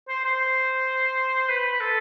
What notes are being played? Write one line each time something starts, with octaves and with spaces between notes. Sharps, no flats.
C5
C5
B4
A4